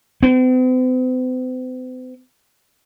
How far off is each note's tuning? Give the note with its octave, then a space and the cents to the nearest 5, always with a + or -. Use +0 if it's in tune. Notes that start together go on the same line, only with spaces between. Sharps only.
C4 -45